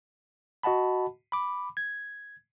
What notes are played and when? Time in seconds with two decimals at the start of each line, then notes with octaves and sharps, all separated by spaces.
0.63 F#4 D#5 F#5 A5 B5
1.32 B5 D6
1.77 G#6